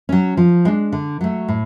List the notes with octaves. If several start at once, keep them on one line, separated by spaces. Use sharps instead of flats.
F#3 C#4
F3
G#3 D4
D3
F#3 A3
A2